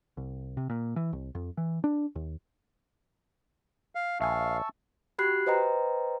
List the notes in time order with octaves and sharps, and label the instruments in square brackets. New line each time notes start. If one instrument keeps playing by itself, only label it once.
[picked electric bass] C2
C3
A#2
E3
C2
F2
E3
D4
D#2
[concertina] F5
[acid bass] A#1 [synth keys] E5 G#5 [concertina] F5 [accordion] A5 C#6 E6
[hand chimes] F#4 G4 B5 F#6 C7
B4 C5 D#5 G5 A#5